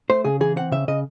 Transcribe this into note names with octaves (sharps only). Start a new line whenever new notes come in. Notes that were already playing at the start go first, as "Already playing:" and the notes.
A3 C5
C#3 G#4
E3 G#4
C4 F#5
C#3 E5
C#3 D#5